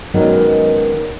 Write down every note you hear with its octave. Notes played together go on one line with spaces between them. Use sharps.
D#3 F#3 G#3 B3 C#4 D#4